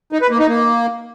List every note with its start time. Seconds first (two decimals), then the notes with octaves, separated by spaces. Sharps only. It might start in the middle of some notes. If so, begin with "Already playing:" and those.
0.12 D#4
0.21 B4
0.30 A#3
0.39 D#4
0.48 A#3